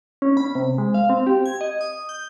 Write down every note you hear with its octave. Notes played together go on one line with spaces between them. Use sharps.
C#4
B5
C3
G#3
F5
C4
G4
G#6
D#5
D#6
G6